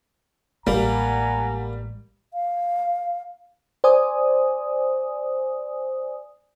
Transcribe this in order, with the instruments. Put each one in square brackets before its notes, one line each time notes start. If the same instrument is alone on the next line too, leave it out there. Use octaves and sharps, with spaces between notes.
[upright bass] A1 G#3 [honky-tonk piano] G3 [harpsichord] A#3 [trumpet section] F#5 G#5 A#5
[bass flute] F5
[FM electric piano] C5 D5 G#5 D#6